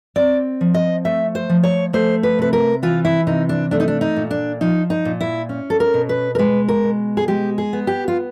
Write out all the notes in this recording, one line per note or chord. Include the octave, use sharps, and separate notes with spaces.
C4 D5
F3
D#5
A3 E5
C5
F3
C#5
A3 C5
B4
C3 B4
A#4
E3 F4
E4
C3 D#4
D4
A3 D4
D#4
D4
D#4
A#2
D4
F3 D#4
D#4
A#2
E4
C#4
A4
A#4
B2
B4
A#4
G#3 B4
A#4
B2
G#4
G#3 G4
G#4
B3
G4
F4